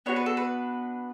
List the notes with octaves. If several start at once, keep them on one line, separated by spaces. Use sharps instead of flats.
B3 D4 F#4 C#5
B4
A4
B4